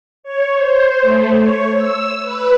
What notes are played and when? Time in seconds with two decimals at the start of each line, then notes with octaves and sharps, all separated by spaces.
0.24 C#5
0.54 C5
1.02 A3
1.41 C#5
1.75 E6
2.22 B4